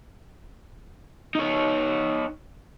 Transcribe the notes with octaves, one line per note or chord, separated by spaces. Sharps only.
D#4 C#5